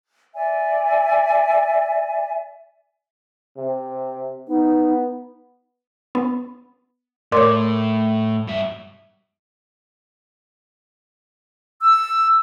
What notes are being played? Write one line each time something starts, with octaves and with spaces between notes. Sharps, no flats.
D5 E5 G#5
C3
B3 D#4
B3
A2 A#4 C#5 D5 C6 D6
G2 E5
E6